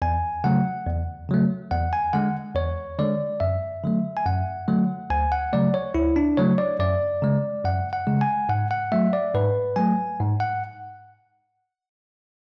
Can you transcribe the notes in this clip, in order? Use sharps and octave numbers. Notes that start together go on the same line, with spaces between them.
E2 G#5
C#3 F#3 A3 F#5
E2
C#3 F#3 A3
E2 F#5
G#5
D3 G#3 F#5
E2 C#5
D3 G#3 D5
F#2 E5
D3 F#3 A3
G#5
F#2 F#5
D3 F#3 A3
D2 G#5
F#5
C#3 F#3 A3 D5
C#5
D2 E4
D4
C#3 F#3 A3 C#5
D5
F#2 D5
C#3 G#3
F#2 F#5
F#5
C#3 G#3
G#5
G#2 F#5
F#5
F#3 A3 E5
D5
G#2 B4
F#3 A3 G#5
G#2
F#5